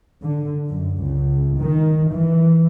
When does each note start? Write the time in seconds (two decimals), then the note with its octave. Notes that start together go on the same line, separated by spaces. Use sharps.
0.23 D3
0.68 F#2
0.96 C#2
1.59 D#3
2.12 E3